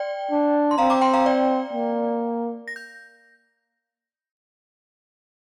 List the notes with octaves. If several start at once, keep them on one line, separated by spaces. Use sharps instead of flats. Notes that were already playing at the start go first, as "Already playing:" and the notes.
Already playing: D5 G5
D4
C6
C4 F5 A#5
A#5 D6
G5 C6
F5 A#5
D5 G5
A#3
A#6
G6